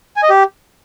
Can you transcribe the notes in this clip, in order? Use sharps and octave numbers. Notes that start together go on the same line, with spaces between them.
G#5
D#5
G4